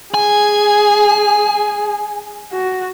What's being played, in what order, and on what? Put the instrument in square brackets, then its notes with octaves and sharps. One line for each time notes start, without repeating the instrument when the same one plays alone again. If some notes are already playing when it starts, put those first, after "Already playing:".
[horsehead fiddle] G#4 [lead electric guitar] G#5
[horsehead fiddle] F#4